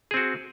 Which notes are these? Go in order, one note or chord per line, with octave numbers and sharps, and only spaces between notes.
C4 F#4 G#4